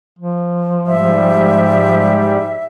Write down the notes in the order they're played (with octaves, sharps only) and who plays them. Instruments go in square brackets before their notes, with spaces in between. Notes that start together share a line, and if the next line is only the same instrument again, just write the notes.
[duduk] F3
[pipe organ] G#2 G3 [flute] E5